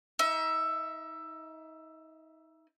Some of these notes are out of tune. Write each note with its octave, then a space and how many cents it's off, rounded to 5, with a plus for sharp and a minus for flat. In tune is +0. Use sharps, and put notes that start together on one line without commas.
D#4 +35 E5 +10